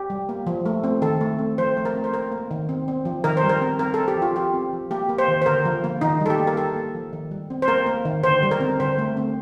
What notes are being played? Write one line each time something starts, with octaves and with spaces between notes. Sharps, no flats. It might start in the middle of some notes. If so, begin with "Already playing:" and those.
Already playing: G4
G3
A#3
F3
A3
C4
D#3 A4
A3
C4
F3 C5
A3
A#4
C4
C5
A#3 A#4
A#3
D#3
C4
C4
F3
D#3 A#4
C5
G3
A#4
C4
C4 A#4
C4 A4
G4
F3
F4
C4 G4
C4
F3
A#3 G4
A#3
C5
D#3
C5
D3 A#4
F3
A#3
D#3 D#4
G3
A4
G4
A#3
A#4
A#3 A4
A#3
F3
D#3
G3
C4
C5
A#3 A#4
A#3
D#3
D3 C5
G3
A#4
C4
D3 C5
A3
C4